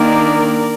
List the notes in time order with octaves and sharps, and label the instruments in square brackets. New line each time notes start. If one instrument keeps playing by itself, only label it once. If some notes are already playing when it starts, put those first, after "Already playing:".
Already playing: [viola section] D#3 A#3 D4 A#4 D5